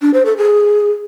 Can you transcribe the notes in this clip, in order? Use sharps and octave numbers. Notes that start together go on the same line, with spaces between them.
D4
C5
A4
G#4